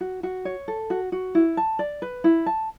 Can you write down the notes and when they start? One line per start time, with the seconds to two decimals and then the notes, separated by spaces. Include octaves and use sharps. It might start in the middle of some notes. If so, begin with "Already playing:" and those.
0.01 F#4
0.23 F#4
0.45 C#5
0.68 A4
0.90 F#4
1.12 F#4
1.35 E4
1.57 A5
1.79 D5
2.02 B4
2.24 E4
2.46 A5